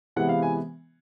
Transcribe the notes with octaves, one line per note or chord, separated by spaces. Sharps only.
C3 E3 G#3 B3 F#5
F5
G#5